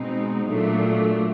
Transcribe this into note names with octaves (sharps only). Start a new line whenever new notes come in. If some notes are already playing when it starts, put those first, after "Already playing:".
Already playing: B2 G#3 C4 D#4
A#2 F#3 A3 D4